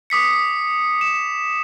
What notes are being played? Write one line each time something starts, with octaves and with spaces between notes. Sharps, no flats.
D6 D#6 B6 C#7
E7